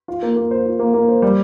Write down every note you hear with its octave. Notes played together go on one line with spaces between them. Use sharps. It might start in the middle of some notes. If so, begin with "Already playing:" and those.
F4
A#3
A#3
C5
F4
A#3
A#3
C5
G3